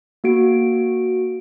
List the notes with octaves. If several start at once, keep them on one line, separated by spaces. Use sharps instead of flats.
A#3 F#4 D7